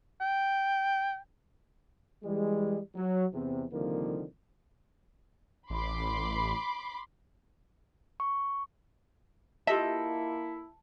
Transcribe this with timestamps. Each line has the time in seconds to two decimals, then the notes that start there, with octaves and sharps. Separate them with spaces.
0.21 G5
2.24 E3 G3 G#3
2.96 F#3
3.34 E2 C3
3.72 C2 D3 D#3 F3 A#3
5.70 A1 B5 C6 D6
8.20 C#6
9.67 A#3 E4 F4 G4 A4 D#5 E5